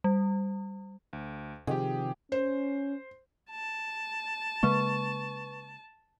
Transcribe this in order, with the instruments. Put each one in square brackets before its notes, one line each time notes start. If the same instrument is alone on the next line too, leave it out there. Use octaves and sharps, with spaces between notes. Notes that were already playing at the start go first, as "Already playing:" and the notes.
[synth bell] G3
[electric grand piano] D2
[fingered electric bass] C3 D#3 F3 [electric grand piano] G4 G#4 [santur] G5
[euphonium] C#4 [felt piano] C5
[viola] A5
[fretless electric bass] C#3 G#3 A#3 [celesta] B4 C#6